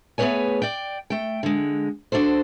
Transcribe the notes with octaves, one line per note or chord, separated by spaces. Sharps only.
A3 B3 G#4 B4 C#5 G#5
D5 G5
A3 G5
D3 G#3
D4 F#4 A4 C5